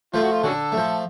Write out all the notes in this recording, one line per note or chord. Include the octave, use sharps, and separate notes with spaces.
F3 A3 F4
F#4
F4
D3 C#4 F#4 A4
A3
F3